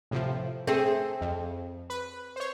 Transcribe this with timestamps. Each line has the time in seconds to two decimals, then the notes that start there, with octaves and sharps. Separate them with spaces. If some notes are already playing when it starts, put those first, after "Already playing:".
0.11 A2 C3 F3
0.67 A3 C4 G#4
1.21 F2
1.90 B4
2.36 C5 C#5